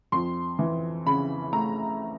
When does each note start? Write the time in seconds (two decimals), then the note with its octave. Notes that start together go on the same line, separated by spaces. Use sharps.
0.12 F2 C6
0.59 E3
1.06 C#3 B5
1.53 A3 A#5